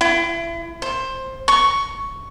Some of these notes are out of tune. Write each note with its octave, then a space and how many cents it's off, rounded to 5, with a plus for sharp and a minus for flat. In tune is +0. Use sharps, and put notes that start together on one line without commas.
E4 +35
C5 +15
C#6 +5